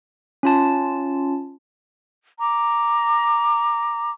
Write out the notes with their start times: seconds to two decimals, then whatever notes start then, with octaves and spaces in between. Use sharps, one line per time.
0.43 C#4 F4 A5
2.40 A#5 D6